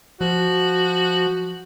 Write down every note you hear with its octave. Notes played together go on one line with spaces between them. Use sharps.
F3 F#4